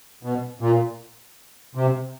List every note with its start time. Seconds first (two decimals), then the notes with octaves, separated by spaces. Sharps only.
0.23 B2
0.60 A#2
1.75 C3